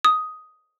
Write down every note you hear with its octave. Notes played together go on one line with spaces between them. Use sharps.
D#6